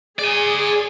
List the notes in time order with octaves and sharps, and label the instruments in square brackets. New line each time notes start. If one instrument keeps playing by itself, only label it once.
[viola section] G#4 [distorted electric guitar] D5 G#5